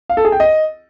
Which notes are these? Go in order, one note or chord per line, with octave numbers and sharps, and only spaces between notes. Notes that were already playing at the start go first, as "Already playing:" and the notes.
F5
A4
G#4
G5
D#5